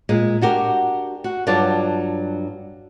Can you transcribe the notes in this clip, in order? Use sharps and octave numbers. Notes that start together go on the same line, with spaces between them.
A#2 G#3
D4 F#4 G4 A#4
F#4
G2 F#3 D4 F4 D5 A5